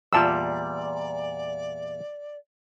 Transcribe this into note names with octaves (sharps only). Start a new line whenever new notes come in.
E2 A#2 G3 F4 D5 A5 E6